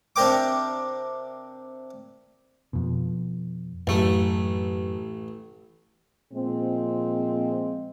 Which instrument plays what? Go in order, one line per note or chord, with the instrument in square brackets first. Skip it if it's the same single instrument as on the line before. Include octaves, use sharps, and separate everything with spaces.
[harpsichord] C3 D4 G4 A#4 G5 D6
[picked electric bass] F2 B2
[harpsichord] A1 A3 [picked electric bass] F#2
[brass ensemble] A#2 F3 G#3 C4